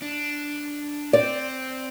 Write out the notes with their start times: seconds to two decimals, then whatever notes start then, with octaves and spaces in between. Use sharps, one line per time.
0.02 D4
1.13 C4 D5